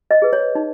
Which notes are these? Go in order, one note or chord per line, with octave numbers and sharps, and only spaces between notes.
D#5
G#4 B4
C#5
D#4